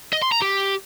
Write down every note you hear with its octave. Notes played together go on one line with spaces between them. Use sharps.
D#5
C6
A#5
G4